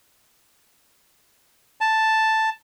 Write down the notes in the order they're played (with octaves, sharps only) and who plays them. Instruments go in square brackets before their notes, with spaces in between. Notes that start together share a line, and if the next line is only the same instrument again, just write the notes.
[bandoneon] A5